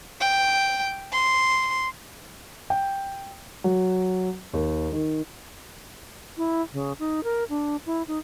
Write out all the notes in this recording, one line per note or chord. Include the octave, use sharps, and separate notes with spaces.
G5
C6
G5
F#3
D#2
D#3
E4
C#3
D#4
A#4
D4
E4
D#4